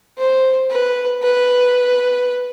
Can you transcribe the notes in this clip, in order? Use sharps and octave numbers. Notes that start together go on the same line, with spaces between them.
C5
B4
B4